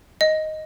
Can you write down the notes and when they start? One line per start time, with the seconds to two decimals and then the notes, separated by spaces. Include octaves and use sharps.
0.21 D#5